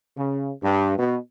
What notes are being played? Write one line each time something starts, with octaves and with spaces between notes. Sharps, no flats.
C#3
G2
B2